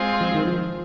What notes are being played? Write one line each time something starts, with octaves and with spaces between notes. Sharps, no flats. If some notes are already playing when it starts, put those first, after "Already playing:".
Already playing: G#3 C4 F4 G#4
F3
D#3
F3